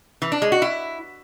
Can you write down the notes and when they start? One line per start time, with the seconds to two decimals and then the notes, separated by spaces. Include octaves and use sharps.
0.22 E3
0.32 D4
0.42 G#3
0.52 F#4
0.62 E4